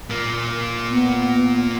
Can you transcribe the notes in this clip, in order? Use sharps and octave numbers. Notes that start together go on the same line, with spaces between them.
A#2 A#3
B3